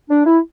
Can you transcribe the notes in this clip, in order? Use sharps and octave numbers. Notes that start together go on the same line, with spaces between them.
D4
E4